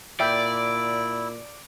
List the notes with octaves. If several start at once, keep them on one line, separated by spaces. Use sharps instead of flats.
A#2 E4 D5 E5 G5